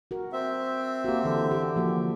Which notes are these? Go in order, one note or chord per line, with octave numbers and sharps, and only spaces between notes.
F#4 A#4
C4 E5
A#3 F#4 G4
D3 E3 A4 B4
G4
F3 A#3 F#4